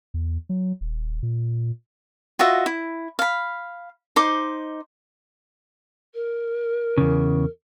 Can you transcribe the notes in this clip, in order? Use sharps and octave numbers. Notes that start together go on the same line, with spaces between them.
E2
F#3
D#1
A#2
F4 F#4 D#5 E5
E4
F5 B5
D#4 C5 C6 D6
A#4
E2 C#3